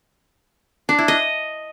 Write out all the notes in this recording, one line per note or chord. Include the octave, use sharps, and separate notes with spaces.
D4
E4
D#5